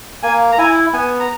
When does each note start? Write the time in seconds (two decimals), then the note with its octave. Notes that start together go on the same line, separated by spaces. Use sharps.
0.23 A#3 G#5
0.52 A#5
0.58 E4 G#5
0.93 B3 G#5
1.20 A#5